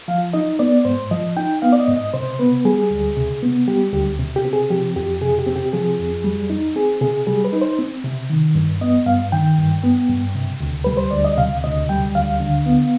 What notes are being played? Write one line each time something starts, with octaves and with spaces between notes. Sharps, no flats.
F3 F5
D#4 D#5
B3 D5
G#2 C5
F3 D#5
D#4 G5
B3 F5
D5
D#5
G#2
D#5
C3 C5
B3 B4
G3 G#4
D2
C3
B3
G3 G4
D2 G4
C3
G4
C4
G#4
F3 G4
F2 G4
C3 G#4
G4
C4
G4
F3 G#4
F2
G3
D#4
C4 G#4
C3 G#4
G3 G#4
B4
D#4
C5
C4
C3
D#3
G2
B3 D#5
G2 F5
D#3 G5
G2
B3
G2
C3
D2
G3 B4
C5
D2 D5
D#5
C3 F5
D2 D#5
G3 G5
D2 F5
D3
B3